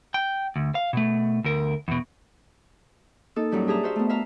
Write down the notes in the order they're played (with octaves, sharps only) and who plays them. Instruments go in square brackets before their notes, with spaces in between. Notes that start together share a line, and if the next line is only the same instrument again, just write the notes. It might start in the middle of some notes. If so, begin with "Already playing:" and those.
[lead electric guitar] G5
D2
F5
B2 A3
D2 A#4
E2 B2
[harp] A#3 D#4 A4
F#2 A#2 F#3 G3 G4
D4 G4 G#4 E5 A5 A#5
F#4 C5 E5 F5
A3 B3
E5 F5 A#5